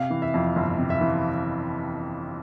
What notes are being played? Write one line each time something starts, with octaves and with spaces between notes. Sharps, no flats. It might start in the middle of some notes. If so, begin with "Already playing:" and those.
Already playing: C3 F5
E3
E5
F2
G1
C3
E5
E3